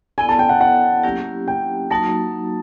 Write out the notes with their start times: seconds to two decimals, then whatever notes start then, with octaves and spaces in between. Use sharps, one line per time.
0.18 B3 E4 A4 D5 G#5
0.29 A5
0.39 G5
0.49 F#5
0.61 F#5
1.03 F#3 A#3 C#4 E4 G4
1.48 G5
1.90 F#3 A#3 D#4 F#4 A5